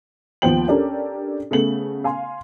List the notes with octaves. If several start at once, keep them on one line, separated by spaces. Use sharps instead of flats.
D#2 F3 B3 C5 G5 F#7
C#4 D4 G4 A4 A#4
C#3 A3 B3 F#7
F5 G#5 C6